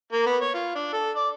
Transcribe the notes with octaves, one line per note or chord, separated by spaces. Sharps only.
A#3
B3
C#5
F4
D4
A4
D5